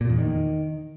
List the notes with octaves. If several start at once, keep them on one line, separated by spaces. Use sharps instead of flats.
A#2
E2
D#3